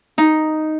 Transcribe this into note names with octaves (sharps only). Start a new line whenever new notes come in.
D#4